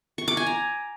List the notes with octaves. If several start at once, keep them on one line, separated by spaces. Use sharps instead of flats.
C#6
D6
G#5
A#5